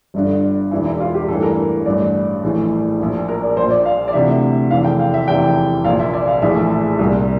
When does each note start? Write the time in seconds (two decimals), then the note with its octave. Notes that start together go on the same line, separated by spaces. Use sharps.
0.14 G1 G2 D3
0.71 E1 E2 E3 E4
0.85 E4
1.00 F4
1.14 G4
1.28 A1 G2 E3 A4
1.42 A#4
1.86 A1 G2 D3 D5
2.43 A#1 A2 E3
2.99 A#1 A#2
3.29 A#4
3.43 D5
3.56 A#1 C5
3.60 A#2
3.71 D5
3.86 F5
4.08 D5
4.13 D2 C3 E3 E5
4.71 F1 E2 E3 F5
4.84 G5
5.00 F5
5.14 E5
5.28 F1 E2 C3 E3 G5
5.84 A#1 A#2 F5
6.00 E5
6.14 D5
6.27 F5
6.42 A#1 A2 E3 E5
6.99 C2 A#2